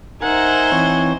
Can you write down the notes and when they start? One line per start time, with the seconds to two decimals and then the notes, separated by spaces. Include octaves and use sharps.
0.22 D#4 A#4 C5 E5 F#5 G#5
0.72 E3 C4 C#5